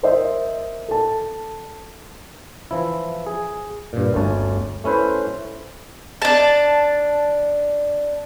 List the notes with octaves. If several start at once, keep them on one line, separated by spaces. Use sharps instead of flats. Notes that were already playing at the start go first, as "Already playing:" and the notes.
A#4 C5 D#5 E5
A4 A5
E3 F3 E4
G#4
G2 A#2
G1 D2 C#4 A5
A3 C#4 E4 B4 C5
D4 A5